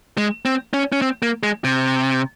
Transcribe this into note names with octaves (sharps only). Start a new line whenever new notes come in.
G#3
C4
C#4
C#4
C4
A#3
G#3
C3